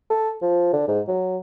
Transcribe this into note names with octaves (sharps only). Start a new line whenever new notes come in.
A4
F3
D3
G#2
F#3